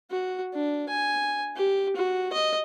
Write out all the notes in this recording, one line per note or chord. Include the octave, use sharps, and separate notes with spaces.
F#4
D4
G#5
G4
F#4
D#5